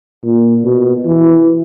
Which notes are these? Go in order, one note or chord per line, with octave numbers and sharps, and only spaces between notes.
A#2
B2
E3